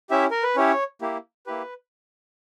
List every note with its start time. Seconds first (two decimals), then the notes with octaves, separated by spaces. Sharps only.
0.10 C#4 E4 G4 E5
0.31 A#4
0.43 B4
0.56 C#4 E4 G4 C#5
1.01 A#3 E4 G4
1.47 A#3 E4 G4 B4